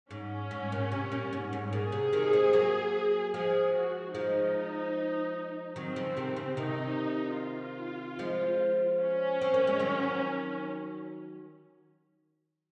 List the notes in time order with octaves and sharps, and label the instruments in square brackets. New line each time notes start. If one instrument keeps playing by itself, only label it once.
[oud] G#2 [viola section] C#4
[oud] G#2
A#2
C3
A#2
G#2
G#2
[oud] A#2 [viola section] G#4
[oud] C3
C3 D#3
G#3 C4
F#3 A#3
[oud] F3 G#3 [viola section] G#4
[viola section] F#4
[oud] F3 G#3 [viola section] D#4
[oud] D#3 F#3 [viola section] C4
[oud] C#3 F3
C3 D#3
C#3
[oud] C3 D#3 [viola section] D#4
[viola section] F4
[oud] F3 G#3
[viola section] C#4
[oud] C4
A#3
G#3
D#3 F#3